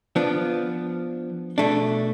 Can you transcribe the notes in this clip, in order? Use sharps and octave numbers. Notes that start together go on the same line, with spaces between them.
F3 B3 D4
B2 A3 D4